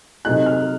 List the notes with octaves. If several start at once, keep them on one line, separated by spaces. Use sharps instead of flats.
C3 F#3 A3 D#4 F#6
F6